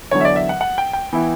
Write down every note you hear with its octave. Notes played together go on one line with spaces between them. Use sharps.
E2 D3 F#3 C#5
E5
D5
E5
F#5
F#5
G5
G5
E3 B3 E4